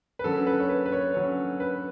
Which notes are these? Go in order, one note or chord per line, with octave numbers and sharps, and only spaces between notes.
B4
D3 F#3 C#4 A4
B4
C#5
B4
B4
C#5
D3 F#3 C#4 C#5
B4